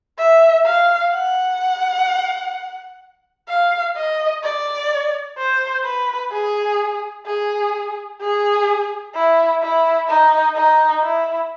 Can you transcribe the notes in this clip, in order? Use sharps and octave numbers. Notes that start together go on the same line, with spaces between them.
E5
F5
F#5
F5
D#5
D5
C5
B4
G#4
G#4
G#4
E4
E4
D#4
D#4
E4